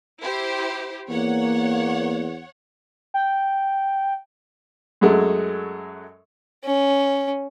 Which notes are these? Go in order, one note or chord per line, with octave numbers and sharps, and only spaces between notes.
E4 G4 C5
E2 A#3 C#5 F#5
G5
F#2 F#3 G#3 A3
C#4